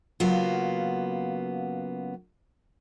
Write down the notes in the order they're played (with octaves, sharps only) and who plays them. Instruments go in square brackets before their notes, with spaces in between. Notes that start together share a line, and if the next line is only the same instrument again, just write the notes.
[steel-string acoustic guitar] C#3 F#3 A#3 B3 F4